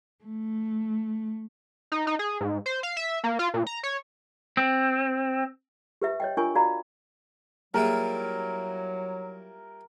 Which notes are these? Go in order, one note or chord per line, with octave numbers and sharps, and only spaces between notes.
A3
D#4
D#4
G#4
G#2
C5
F5
E5
A#3
F4
A#2
A#5
C#5
C4
G4 B4 E5
C#5 D#5 G5
D4 F4 A#4 G#5 C#6
F#4 D5 F5 A#5 B5
F#3 G3 A#3 E4 F4 G#4 A#4